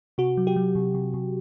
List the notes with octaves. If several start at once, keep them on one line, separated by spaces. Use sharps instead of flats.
C3 F#4
F#3
G4
F#3
C3
C3
C3